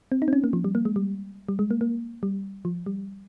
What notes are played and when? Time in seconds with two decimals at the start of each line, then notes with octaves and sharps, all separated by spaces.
0.12 C4
0.22 D#4
0.28 C4
0.33 C#4
0.44 A#3
0.53 F3
0.64 G3
0.75 A#3
0.85 G#3
0.96 G3
1.49 G3
1.59 G#3
1.71 A#3
1.81 A#3
2.23 G3
2.65 F3
2.86 G3